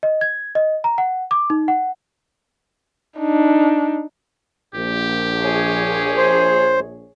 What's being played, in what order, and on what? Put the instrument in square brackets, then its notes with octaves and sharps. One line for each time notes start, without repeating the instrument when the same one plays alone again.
[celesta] D#5
G#6
D#5
A#5
F#5
D6
D#4
F#5
[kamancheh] D4 D#4
[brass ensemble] A#1 [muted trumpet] G4
[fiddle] G#4 C#5
[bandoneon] C5